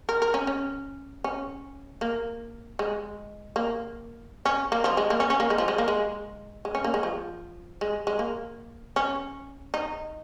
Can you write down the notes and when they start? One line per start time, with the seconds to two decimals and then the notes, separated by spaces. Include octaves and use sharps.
0.09 A#4
0.22 A#4
0.34 C#4
0.47 C#4
1.24 C#4
2.01 A#3
2.79 G#3
3.56 A#3
4.45 C#4
4.72 A#3
4.84 F3
4.97 G#3
5.10 A#3
5.20 C#4
5.30 C#4
5.40 A#3
5.50 G#3
5.58 F3
5.68 G#3
5.78 A#3
5.88 G#3
6.65 G#3
6.75 C#4
6.84 A#3
6.94 G#3
7.03 F3
7.81 G#3
8.07 G#3
8.19 A#3
8.96 C#4
9.74 D#4